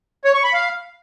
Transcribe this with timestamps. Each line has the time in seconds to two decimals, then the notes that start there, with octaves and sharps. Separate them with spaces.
0.25 C#5
0.34 C#6
0.44 B5
0.53 F5